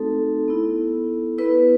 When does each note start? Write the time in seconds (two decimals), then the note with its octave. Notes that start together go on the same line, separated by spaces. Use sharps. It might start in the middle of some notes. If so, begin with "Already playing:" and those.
Already playing: A3 C4 D#4 F#4 A4
0.48 B3 E4
1.38 B3 E4 B4